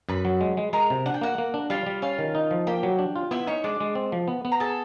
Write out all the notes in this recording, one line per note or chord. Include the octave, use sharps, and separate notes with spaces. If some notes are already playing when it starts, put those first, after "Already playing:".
F#2 B4 B5
F#3
G#3
G#3
G#3 A#4 A#5
C3
D4 F#5
G5
A#3 F#4 F#5
A#3
D4
G3 F4 F5
G3
C#4 F4 F5
D#3
D#4
F3
A#3 G4 G5
F#3
D4
F4
B3 E4 E5
C#4 D#4 C#5
G#3 D4 D5
G#3
C4
F3
B3
B3
A#5
G#4 A4 A5